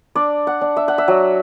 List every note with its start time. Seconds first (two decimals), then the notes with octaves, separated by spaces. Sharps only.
0.15 D4 D5
0.47 F#5
0.61 D4
0.77 E5
0.88 F#5
0.98 E5
1.08 F#3